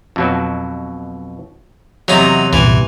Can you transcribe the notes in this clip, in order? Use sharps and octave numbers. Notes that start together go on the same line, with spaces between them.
F2 B2 F#3
E2 C3 F#3 D#4
C2 G2 A#2 E3